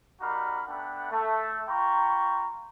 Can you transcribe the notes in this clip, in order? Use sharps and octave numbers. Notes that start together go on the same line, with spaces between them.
G3 D#4 F#4 A#4 F5 B5
A3 B3 D4 F#5 G5 B5
A3
F4 G5 A#5 B5 C#6